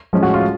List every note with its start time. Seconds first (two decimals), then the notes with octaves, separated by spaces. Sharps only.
0.13 A2 F3 G#3 C#4
0.23 F#4
0.34 F4